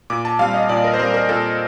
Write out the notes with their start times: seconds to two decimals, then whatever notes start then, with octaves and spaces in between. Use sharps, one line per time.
0.10 A#2 D6
0.25 A5
0.39 G3 C4 F5
0.54 D#5
0.69 A#2 D5
0.84 A#4
0.94 C5
0.99 G3 C4 A#4
1.14 A#4
1.29 A#2 A4